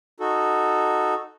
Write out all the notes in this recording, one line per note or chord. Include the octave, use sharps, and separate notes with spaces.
D#4 F#4 A4